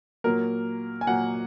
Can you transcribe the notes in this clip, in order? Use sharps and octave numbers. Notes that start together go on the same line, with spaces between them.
A#2 F#3 A#3 A#4
G#5
A#2 F#3 A#3 F#5